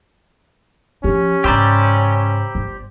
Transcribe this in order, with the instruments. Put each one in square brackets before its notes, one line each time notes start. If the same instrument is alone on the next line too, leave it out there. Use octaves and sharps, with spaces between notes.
[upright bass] F3 [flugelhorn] C#4 [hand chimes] G4
[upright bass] G#2 C#3 [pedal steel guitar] G4 C5 D5 [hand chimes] A#5 B5 E6
[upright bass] G1